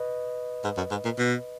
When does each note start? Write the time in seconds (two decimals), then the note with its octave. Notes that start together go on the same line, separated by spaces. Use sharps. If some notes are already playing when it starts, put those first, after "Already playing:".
Already playing: B4 D#5
0.64 G#2
0.77 F#2
0.91 G#2
1.05 A#2
1.18 B2